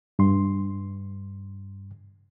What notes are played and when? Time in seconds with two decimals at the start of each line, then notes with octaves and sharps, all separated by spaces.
0.19 G2 C6